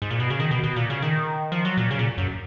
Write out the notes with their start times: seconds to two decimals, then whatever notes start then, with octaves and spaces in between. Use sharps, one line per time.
0.02 G#2
0.11 A#2
0.20 B2
0.30 C#3
0.40 D#3
0.51 B2
0.63 B2
0.76 A#2
0.90 C#3
1.02 D#3
1.52 F3
1.65 F#3
1.77 A#2
1.91 C#3
1.99 A#2
2.18 F#2